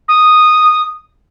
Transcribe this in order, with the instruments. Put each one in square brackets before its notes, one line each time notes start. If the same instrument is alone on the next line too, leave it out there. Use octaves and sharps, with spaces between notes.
[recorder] D#6